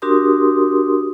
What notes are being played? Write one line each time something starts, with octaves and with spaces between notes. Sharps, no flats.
D4 F#4 G4 A#4 C6 D#6